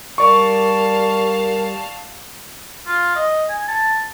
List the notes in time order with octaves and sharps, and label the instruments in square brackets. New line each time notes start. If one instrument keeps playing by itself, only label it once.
[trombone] G3 [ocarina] A#4 [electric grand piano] D5 C#6 [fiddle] F5 A5
[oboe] F4
D#5
G#5
A5